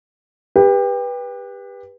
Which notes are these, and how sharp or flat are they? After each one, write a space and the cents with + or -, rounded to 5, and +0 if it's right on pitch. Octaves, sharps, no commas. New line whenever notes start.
G4 +25 B4 -15